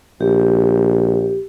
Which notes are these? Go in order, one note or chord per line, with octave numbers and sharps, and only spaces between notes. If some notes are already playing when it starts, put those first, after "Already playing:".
A#1 G4